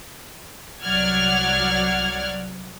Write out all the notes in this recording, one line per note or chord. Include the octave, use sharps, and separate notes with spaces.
C2 F#3 D5 F#5 F6 G#6